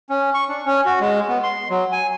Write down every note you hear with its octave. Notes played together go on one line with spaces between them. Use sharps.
C#4
C#6
D4
C#4
F#4
G#3
B3
C6
F#3
G#5